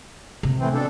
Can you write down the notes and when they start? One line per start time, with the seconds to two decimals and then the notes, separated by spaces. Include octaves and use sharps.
0.43 C3
0.60 A2 E3 C4
0.74 B2 D4 A4